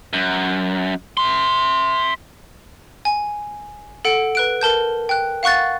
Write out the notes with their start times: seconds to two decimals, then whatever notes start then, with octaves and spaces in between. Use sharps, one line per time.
0.13 F#2
1.17 E5 C6
3.05 G#5
4.05 A4 F#5 D7
4.35 B4 F#6 D7
4.61 A#4 A5 G6
5.09 G5 F#6
5.43 F5 F#5 C#6 F#6 A6